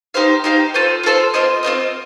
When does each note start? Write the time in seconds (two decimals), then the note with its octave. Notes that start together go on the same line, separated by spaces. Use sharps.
0.14 D#4 G4 C5 F5
0.44 D#4 G4 C5 F5
0.74 F4 A4 C5
1.03 F4 A4 C5
1.34 C4 F4 C5 D#5
1.63 C4 F4 C5 D#5